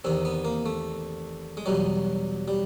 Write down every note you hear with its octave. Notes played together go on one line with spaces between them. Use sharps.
E2 C3 D#3 C4
B3
A#3
A3
G#3
E2 B2 F#3 G3
G3